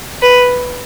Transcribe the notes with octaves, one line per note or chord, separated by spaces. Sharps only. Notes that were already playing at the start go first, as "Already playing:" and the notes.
B4